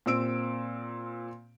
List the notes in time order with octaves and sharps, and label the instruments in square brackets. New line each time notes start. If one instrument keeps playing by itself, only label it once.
[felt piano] A#2 C4 E6 D7